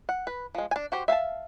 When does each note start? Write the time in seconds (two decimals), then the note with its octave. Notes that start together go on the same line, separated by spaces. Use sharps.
0.09 F#5
0.27 B4
0.55 F3 G#3
0.71 D4 G#5
0.92 F#4 G4 C5
1.08 E5 F5 G#5 A5